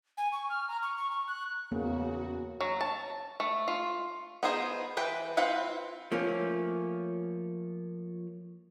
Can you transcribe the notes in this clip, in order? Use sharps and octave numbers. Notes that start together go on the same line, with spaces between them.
G#5
C#6
F6
A#5
C#6
C#6
C#6
F#6
E2 C#3 A#3 F#4
F#3
A5
A3
F4
B3 D#4 F4 G#4 C5
E3 B4 G5
C4 F4 B4 F5 F#5
F3 A3 A#3 C#4